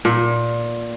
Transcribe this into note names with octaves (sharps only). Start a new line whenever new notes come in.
A#2